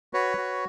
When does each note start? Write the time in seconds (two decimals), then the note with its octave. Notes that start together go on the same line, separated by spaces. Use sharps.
0.13 F#4 B4 C#5
0.37 F#4